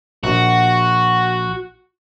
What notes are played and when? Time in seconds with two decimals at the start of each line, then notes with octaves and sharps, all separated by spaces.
0.23 A#1 F#4